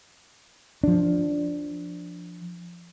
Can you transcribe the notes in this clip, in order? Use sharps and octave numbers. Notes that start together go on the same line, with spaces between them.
F3 D4